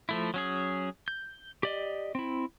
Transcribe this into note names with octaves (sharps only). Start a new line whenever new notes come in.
F3 A3 E4
F#3 C#4 G#4
G6
G4 D5 D#5
C4 E4